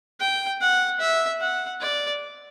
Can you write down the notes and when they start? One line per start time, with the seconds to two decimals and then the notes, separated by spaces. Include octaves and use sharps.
0.20 G5
0.61 F#5
1.00 E5
1.40 F#5
1.81 D5